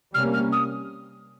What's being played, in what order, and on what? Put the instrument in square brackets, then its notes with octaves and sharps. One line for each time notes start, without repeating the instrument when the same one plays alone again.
[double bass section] C3 G3 A#3 C#4 [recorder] F6
[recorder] F6
D#6